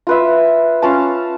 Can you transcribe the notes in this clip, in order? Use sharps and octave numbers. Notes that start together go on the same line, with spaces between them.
F4 B4 E5
C#4 F4 F5 A5